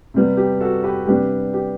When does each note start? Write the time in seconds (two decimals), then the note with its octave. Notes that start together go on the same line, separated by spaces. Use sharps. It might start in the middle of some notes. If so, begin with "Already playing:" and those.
0.14 C3 G3 B3
0.37 G4
0.61 F#4 A4
0.84 G4 B4
1.07 C3 G3 B3 D4 G4
1.54 G4